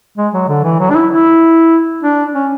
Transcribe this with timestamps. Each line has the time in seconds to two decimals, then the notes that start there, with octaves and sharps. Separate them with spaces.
0.18 G#3
0.33 F#3
0.49 D3
0.64 E3
0.79 F#3
0.90 D4
0.95 E4
1.11 E4
2.04 D4
2.35 C#4